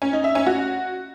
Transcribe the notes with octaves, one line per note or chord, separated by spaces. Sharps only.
C#4
D#4
E5
C#4
F#4